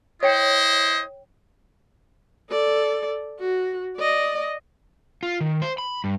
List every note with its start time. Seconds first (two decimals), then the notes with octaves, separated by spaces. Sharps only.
0.23 E4 C5 C#5 D#5 G5
2.49 A4 D5
3.39 F#4
3.97 D5 D#5
5.23 F4
5.41 D#3
5.62 C5
5.78 B5
6.04 G2